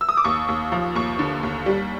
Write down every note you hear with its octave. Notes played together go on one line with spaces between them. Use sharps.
E6
D#6
D6
D#2 C#6
D#2
F3
D#2 C#6
D3
D#2
G3